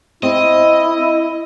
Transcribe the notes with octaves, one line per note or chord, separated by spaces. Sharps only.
C4 E4 D#5